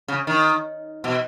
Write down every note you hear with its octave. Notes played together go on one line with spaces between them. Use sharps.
C#3
D#3
B2